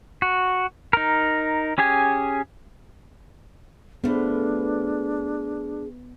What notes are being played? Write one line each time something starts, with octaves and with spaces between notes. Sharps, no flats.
F#4
D#4 A#4
C#4 G4 G#4 G#5
F3 A3 B3 D4 G#4 B4